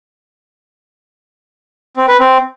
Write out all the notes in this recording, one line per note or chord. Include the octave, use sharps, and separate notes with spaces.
C4
B4
C4